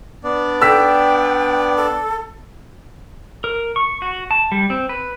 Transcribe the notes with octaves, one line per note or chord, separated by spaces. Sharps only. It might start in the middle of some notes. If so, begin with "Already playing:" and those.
B3 D4 D5
G5 E6 B6
A4
A#4
C#6
F#4
A5
G3
C4
B4